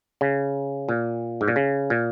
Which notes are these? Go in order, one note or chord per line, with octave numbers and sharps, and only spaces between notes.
C#3
A#2
G#2
A#2
C#3
A#2